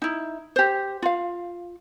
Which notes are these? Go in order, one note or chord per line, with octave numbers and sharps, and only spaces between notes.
D#4 E4
G4 C5
F4 F5